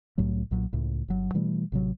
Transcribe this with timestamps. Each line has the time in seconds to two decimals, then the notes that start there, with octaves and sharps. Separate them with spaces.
0.18 C2 A2 F#3 A3
0.51 B1 A#2 F#3
0.73 C#2 A2
1.08 G1 F#3
1.34 B2 E3 G3 A3
1.72 A1 C3 F#3